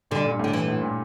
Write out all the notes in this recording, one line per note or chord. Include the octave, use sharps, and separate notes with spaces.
G2 A#2 D3
G2 A#2
A2
D3
E3
A2
A#2